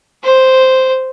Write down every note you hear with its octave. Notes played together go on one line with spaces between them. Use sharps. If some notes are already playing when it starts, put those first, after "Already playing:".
C5